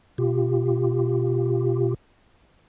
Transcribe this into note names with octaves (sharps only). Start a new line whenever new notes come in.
B2 F4 G4